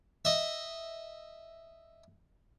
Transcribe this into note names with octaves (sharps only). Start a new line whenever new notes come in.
D#5 E5